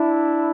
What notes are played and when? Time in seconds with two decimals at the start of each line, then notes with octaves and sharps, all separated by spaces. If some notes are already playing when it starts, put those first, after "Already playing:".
Already playing: D4 E4